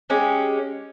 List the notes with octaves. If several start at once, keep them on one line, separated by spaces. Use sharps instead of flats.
G#3 C#4 G4